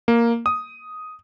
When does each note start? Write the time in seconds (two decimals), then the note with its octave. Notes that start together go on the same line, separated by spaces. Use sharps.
0.08 A#3
0.46 D#6